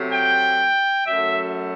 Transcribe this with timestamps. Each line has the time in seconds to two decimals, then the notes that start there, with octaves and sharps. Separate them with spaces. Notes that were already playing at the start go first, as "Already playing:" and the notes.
Already playing: C3 F#3 A3
0.12 G5
1.06 F#2 F#3 A3 E5